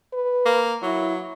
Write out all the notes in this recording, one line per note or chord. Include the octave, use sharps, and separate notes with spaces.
B4
A#3
F#3 E4